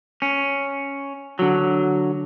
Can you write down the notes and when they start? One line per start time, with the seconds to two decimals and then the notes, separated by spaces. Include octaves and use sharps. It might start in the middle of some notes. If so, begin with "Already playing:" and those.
0.22 C#4
1.39 D3 F#3